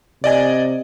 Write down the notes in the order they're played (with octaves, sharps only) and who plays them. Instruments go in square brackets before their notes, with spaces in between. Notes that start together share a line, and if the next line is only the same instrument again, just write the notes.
[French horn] C3 [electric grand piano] D5 D#5 G#5